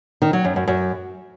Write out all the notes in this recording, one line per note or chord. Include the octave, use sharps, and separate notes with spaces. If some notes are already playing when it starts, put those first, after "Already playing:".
D#3
F#3
F#2
F#2
F#2